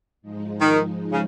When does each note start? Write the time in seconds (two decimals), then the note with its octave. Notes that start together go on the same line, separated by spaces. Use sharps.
0.22 G#2 F3 G#3 D#4
0.61 D#3
1.12 C#3